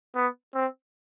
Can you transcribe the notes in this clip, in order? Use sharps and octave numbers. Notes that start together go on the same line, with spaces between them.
B3
C4